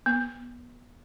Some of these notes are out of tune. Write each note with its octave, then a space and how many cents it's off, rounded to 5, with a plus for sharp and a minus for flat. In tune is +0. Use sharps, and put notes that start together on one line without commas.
B3 -25